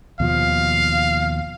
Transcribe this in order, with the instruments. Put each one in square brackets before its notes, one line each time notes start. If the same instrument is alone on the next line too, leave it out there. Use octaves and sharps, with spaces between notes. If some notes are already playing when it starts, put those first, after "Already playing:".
[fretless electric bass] D#2 B2 F3 [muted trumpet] F5